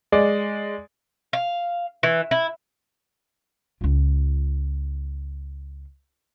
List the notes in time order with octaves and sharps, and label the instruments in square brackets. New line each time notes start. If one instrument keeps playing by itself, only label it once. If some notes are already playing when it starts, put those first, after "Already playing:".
[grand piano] G#3 D5
[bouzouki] F5
E3
E4
[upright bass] C#2 F4